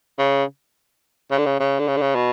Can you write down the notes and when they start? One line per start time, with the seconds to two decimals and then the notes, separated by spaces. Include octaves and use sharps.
0.18 C#3
1.31 C#3
1.38 D3
1.46 C#3
1.59 C#3
1.79 D3
1.87 C#3
1.97 D3
2.01 C#3
2.15 B2